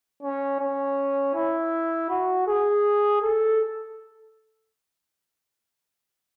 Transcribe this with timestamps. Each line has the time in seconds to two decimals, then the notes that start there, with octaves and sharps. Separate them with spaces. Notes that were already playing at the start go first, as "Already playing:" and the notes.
0.23 C#4
0.59 C#4
1.35 E4
2.10 F#4
2.47 G#4
3.22 A4